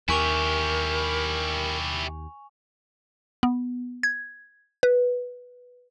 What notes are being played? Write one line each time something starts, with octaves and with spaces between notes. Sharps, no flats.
D#2 E4 G4 A#4 G#5 C#6 F7
B3
G#6
B4